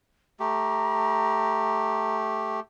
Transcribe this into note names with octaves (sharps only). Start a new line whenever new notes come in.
A3 G4 A#5